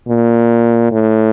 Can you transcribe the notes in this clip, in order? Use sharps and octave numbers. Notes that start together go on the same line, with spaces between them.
A#2
A2